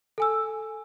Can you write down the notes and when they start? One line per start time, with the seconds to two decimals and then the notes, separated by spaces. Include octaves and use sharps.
0.18 A4 G#5 E6